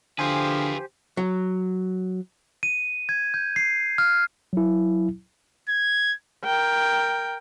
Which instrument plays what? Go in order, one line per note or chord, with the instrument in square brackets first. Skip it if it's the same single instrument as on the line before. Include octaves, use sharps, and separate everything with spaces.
[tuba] D3 [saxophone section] E3 F3 [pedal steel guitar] G4 C5 G#5 [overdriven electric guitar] G#4 B4
[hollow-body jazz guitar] F#3
[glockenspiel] D#7
G#6
G6
C7
F6
[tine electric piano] F#3 E4
[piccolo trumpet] G#6
[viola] A#4 G5